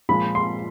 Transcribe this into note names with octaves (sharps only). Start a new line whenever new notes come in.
A#2 F3 G#3 B5
C6